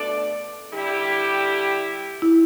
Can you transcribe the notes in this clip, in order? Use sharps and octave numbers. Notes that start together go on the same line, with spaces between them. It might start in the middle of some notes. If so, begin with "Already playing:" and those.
Already playing: B2 A3 D4 A4 D5
D3 G3 E4 G4
E4